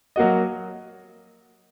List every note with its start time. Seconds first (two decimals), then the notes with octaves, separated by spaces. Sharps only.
0.16 F#3 A#3 F#4 D#5